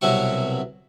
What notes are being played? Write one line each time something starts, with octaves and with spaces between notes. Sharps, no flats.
C2 B2 F#3 E4 C#6